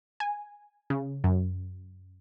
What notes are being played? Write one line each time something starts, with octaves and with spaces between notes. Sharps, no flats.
G#5
C#3
F#2